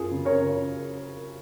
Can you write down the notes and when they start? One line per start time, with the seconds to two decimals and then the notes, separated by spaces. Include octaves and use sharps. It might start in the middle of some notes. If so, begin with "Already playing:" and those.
Already playing: F#2 F4 G#4
0.11 C#3
0.25 A#4 C#5
0.41 C#3